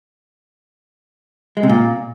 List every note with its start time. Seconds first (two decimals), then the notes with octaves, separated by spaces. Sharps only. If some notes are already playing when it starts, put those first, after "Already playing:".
1.57 G#3
1.63 C3
1.69 A#2